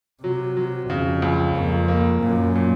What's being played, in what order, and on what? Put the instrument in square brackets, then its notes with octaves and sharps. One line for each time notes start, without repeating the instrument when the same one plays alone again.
[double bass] C3 [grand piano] F#3
[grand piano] F#3
[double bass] F2 [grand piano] C#3
[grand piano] C#2
[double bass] F2 [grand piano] A#3
[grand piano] A#3
[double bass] F#2 [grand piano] A#2
[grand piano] A#2